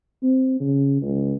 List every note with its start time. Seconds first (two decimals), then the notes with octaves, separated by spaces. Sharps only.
0.23 C4
0.60 C#3
1.02 C#2